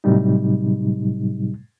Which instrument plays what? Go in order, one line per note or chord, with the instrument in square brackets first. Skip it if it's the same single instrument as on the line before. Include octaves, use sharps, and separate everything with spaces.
[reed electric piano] A2 C3 F#3 G3 D#4